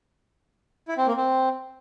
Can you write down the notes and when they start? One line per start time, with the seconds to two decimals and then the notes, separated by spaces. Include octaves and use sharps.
0.88 E4
0.98 C4
1.07 A#3
1.16 C4